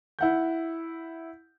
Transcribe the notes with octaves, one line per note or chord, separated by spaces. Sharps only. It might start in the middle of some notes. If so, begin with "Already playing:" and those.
E4 F#5 G6